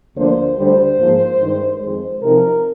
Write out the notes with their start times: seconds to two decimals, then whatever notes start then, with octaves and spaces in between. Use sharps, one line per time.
0.15 D2 D3 F3 A#3 D4 C5
0.56 D2 D3 G3 D4 C5
0.98 G#2 F3 A#3
1.39 G2 D#3 G#3
1.80 F2 D#3 G#3 C5
2.22 C3 F3 C4 D#4 A#4